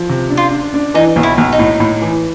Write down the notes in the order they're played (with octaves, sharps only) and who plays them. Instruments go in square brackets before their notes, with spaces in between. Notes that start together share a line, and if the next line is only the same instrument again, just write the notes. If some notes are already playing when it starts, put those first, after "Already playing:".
Already playing: [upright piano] F3
C3
D4
[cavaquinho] F4
[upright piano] D4
D4
[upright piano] E3 [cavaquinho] D#4
[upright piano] B1
[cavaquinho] E4
[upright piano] B1
[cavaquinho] D#4
[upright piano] A2
A2
E3